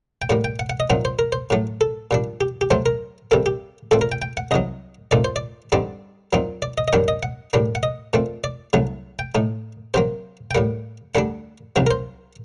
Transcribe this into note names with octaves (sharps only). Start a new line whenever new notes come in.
G5
A2 G3 A#3 F#5
G5
F#5
F#5
D#5
A#2 F#3 C4 D#4 F#5
C5
A#4
C5
A2 F#3 A3
A4
A#2 G3 D4
G4
G4
C3 F#3 A3 C4 C5
A#4
C3 G3 A#3 A4
G4
A#2 A3 C4 A4
A#4
G5
G5
F#5
C2 C3 F#3 D#5
A#2 A3 C4 D#4 D5
C5
D5
G2 D3 G3 C4 D#4 D5
A#2 F#3 C4 D#4
D5
D#5
D#5
F#2 D#3 G3 A#3 D4 F#5
D#5
F#5
A2 G3 A#3 D4
F#5
D#5
A#2 A3 C4
D5
C2 C3 F#3 A3
G5
A2 A3 D#4
C3 F#3 A#3 C5
G5
A2 G3 A#3 F#5
D2 D3 G3 D4 F#5
C2 C3 D#3 F#3 A#3
A#4
C5